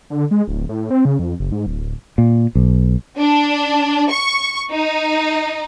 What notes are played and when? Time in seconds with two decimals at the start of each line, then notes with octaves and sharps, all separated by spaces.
0.10 D3
0.31 G#3
0.48 D1
0.69 A2
0.91 C4
1.05 C#3
1.19 F2
1.40 F#1
1.52 G#2
1.67 D1
2.18 A#2
2.55 B1
3.19 D4
4.11 C#6
4.72 D#4